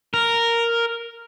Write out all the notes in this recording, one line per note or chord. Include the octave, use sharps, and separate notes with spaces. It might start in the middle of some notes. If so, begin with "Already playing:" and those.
A#4